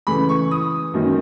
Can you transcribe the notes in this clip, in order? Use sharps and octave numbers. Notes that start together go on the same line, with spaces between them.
C#3 E3 A3 B5
C#6
D#6
F#2 D#3 F#3 A#3